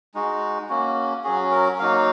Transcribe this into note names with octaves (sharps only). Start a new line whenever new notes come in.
G#3 D#4 F#4
A#3 C#4 F#4
F#3 C#4 F#4 G#4
A#4
F#3 A#3 D#4 F#4 F5